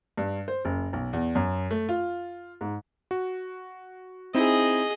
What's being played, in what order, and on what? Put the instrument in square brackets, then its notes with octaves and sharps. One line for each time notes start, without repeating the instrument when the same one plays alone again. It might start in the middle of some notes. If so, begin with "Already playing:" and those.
[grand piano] G2
C5
F#1
B1
E2
F#2
A3
F4
G#2
[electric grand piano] F#4
[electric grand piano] C4 D#4 E4 [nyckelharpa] G#4 D#5